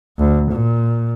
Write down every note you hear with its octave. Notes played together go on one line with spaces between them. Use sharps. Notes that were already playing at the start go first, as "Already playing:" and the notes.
D2
A#2